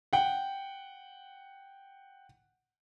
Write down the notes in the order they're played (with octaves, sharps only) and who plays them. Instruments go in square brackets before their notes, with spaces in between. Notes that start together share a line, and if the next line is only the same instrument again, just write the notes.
[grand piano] F#5 G5